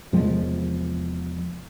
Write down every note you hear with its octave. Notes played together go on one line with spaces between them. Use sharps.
E2 C3 F3 G#3